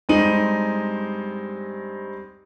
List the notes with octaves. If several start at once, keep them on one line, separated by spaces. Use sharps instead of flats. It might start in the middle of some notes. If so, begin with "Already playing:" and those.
G2 G#3 C4 D#4 D#7 F#7